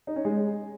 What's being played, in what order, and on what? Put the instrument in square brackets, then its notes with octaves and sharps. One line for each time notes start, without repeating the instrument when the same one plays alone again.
[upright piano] D#4
C#4
G#3